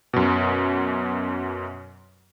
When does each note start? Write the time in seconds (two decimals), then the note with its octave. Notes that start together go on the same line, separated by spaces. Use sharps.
0.13 F#2 B2